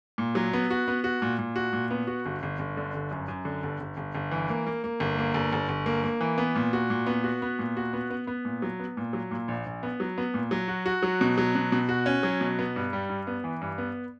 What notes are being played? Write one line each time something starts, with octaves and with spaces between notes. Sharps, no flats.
A#2
F#3
B3
F#4
B3
F#4
A#2
A#2
F#4
A#2
B3
F#4
G1
G1
G1
D3
G1
F#2
F#2
D3
G1
G1
G1
G1
E3
A#3
A#3
A#3
G1
A#3
G1
G1
G1
A#3
A#3
E3
B3
A#2
F#4
A#2
B3
F#4
B3
A#2
F#4
B3
B3
B3
A#2
F#3
B3
A#2
F#3
A#2
A#1
A#1
B3
F#3
B3
A#2
F#3
F#4
F#4
F#3
B2
F#3
B2
B2
F#4
C#4
F#3
B2
B3
G2
G3
G2
B3
E3
G2
B3